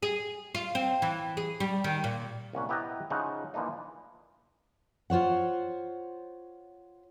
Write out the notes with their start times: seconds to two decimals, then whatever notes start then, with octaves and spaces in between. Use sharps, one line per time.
0.03 G#4
0.55 F4
0.75 C4
1.02 E3
1.37 G#4
1.60 G3
1.84 D#3
2.04 A#2
2.53 C2 A#3 C#4 F#5
2.69 B3 E4 G4 B4 D#5 A#5
3.10 C#3 F3 D#4 E5 F#5
3.54 E3 F3 A#3 D4 D#4
5.10 F4 C5 C#5 F#5